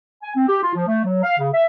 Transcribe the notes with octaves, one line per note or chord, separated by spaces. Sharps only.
G#5
C4
G4
F4
F3
A3
F#3
F5
C#3
E5